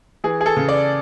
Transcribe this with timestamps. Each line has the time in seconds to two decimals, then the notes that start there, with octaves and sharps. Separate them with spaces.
0.24 E3 G#4
0.41 G#4
0.46 A4
0.57 C#3
0.69 D5